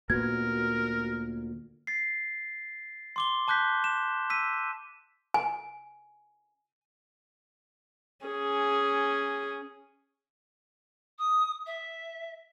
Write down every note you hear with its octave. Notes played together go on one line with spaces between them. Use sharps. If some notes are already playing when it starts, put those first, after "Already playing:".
D2 A#2 B3 F#4 A#4 G#6
A6 C7
C6 D6 G7
A5 D6 F#6 G6 B6
E7
E6 B6 D#7
G#5
C#4 G#4
D#6
E5